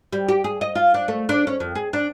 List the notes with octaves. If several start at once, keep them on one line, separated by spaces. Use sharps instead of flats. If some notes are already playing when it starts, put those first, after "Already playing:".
G3
G4
G#4
D#5
F4
D4
A3
D4
C#4
F2
G#4
D4